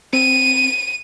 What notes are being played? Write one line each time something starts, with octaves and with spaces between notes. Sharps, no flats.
C4 D#7